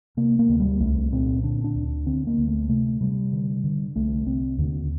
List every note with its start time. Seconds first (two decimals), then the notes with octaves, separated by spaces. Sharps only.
0.17 C3 A#3
0.39 A#3
0.49 D2
0.60 G3
0.80 C2 A3
1.12 A#2 C4
1.43 D3 D4
1.64 D4
1.75 D2
2.06 D3 C4
2.27 A#3
2.38 D2
2.48 A3
2.69 C3 A3
3.01 C3 G3
3.33 D3
3.64 D3
3.96 C2 A3
4.26 C2 C4
4.58 D#2 D3